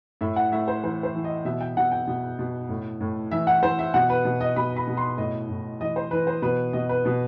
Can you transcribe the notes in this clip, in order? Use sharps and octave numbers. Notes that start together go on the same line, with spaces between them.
A2 E5
F#5
A2 E5
C5
E3 C5
C5
E3
D#5
B2 E5
G5
B2 F#5
G5
B2
B2
A2
A2
E3 E5
F#5
E3 C5
E5
B2 F#5
B4
B2
D#5
B2 B5
B5
B2
C6
A2 D#5
A2
E3 D#5
C5
E3 B4
C5
B2 B4
B2 D#5
B4
B2